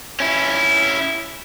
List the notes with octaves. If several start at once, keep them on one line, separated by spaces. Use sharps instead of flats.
C#4 E4